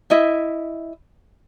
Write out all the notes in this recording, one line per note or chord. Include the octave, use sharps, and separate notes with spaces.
E4 D#5 E5